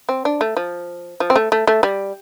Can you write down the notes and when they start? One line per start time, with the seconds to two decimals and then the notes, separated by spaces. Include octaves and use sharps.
0.09 C4
0.25 D4
0.41 A3
0.57 F3
1.20 F3
1.30 C4
1.36 A3
1.52 A3
1.67 A3
1.83 G3